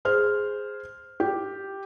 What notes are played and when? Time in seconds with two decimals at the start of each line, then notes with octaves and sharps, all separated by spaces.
0.05 G#4 C5 F6
1.20 G4